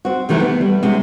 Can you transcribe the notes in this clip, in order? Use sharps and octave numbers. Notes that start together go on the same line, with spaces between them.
C4 F#4
C3 D#3 E3 A3
B3
G3
C3 G#3 B3 C#4